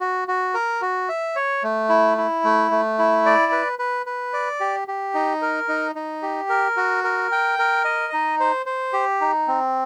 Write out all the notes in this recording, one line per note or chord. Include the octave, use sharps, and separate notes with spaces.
F#4
F#4
A#4
F#4
E5
C#5
A3
E4
E4
A3
A3
E4
D5
B4
B4
B4
D5
G4
G4
D#4
A#4
D#4
D#4
G4
A#4
F#4
A#4
G5
A#4
D#5
D#4
C5
C5
G4
D#4
C4